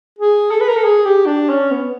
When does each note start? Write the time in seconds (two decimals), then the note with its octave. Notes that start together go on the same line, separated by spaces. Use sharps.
0.19 G#4
0.51 A4
0.61 B4
0.68 A#4
0.77 A4
0.84 G#4
1.05 G4
1.26 D4
1.49 C#4
1.71 B3